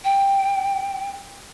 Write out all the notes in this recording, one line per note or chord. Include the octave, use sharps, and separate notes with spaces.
G5